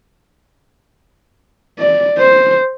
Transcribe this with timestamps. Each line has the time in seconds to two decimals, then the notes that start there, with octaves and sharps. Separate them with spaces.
1.79 D5
2.18 C5